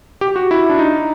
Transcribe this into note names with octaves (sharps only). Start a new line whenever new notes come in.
G4
F#4
E4
D4
D#4